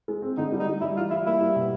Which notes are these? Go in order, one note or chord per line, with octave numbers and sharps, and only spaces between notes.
G#3
C4
D3 D#4
G3
D#4
G3
G3 E4
E3 F4
G3 E4
A#3 E4
G3
B2